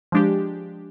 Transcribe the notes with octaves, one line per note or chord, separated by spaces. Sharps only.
F3 G#3 D4 G4